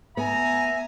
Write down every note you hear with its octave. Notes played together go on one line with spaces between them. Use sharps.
B3 E5 G#5 A#5